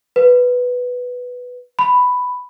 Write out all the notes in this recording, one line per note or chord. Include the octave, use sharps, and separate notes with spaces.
B4
B5